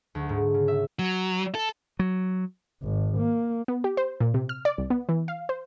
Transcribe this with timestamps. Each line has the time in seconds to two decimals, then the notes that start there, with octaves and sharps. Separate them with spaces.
0.15 D2
0.29 G#2
0.54 C#3
0.68 E5
0.99 F#3
1.55 A4
1.99 F#3
2.82 G#1
3.17 A#3
3.68 B3
3.84 G4
3.97 C5
4.20 A#2
4.34 C3
4.49 F6
4.65 D5
4.78 C2
4.90 B3
5.09 E3
5.28 F5
5.49 C5